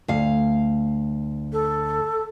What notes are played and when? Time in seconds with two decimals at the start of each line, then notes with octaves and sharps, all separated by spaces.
0.08 D2 F5
1.53 A4